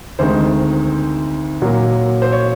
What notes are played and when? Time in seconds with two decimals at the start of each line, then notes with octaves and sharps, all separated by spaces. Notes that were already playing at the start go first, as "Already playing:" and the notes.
0.19 D2 C3 D#3 G#3 C5
1.62 A#2 F#3 A#3
2.22 C5
2.32 C#5